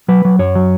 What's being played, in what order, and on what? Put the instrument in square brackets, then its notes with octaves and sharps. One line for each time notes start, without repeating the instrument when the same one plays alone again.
[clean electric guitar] F#3 B4
F#3
F#2 C#5
F#3